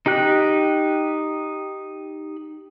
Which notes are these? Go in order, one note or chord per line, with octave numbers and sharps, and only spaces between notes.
D#4 G4 G5 F#6